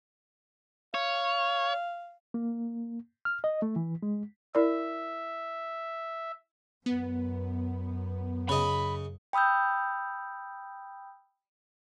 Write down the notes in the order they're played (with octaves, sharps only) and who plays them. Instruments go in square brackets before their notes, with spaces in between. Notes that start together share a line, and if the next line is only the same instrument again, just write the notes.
[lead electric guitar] C#5 [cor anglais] F5
[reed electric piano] A#3
F6
D#5
A3
E3
G#3
[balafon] E4 A#4 D5 [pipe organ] E5
[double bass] F#2 [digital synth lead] B3
[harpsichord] C#3 D#5 [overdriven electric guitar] B5
[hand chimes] G5 B5 D#6 E6 G6